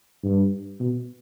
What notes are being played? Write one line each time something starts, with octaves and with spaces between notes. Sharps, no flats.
G2
B2